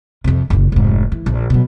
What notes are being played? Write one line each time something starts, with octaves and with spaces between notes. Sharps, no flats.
F2 C3
F#1 A#2
F1 G#2
E3
A#1
B2 F#3